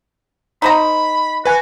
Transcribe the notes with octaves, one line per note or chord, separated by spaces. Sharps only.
D#4 C5 A#5 B5
F#4 B4 G#5